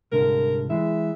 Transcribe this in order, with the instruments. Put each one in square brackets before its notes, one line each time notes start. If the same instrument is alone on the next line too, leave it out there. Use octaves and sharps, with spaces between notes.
[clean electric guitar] C2 G#2 D3 [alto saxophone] A#4
[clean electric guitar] E3 G#3 [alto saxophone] E5